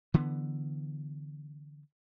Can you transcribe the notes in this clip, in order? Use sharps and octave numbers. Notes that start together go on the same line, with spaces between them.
D3 E3 B3